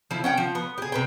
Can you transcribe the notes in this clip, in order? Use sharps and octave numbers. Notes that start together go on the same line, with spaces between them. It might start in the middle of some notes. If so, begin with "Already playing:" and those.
F3 E4
C#4 F#5 G5
F3
B3
G4 G#4
C3 B4 G5